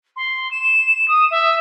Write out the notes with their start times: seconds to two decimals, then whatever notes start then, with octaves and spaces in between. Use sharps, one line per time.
0.16 C6
0.51 E7
1.08 D#6
1.31 E5